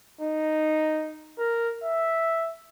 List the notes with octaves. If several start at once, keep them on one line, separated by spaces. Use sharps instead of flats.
D#4
A#4
E5